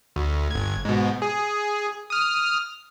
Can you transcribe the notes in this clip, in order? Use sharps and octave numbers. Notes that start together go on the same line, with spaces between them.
D2
G1 G#6
G#2 B2
G#4
D#6 F6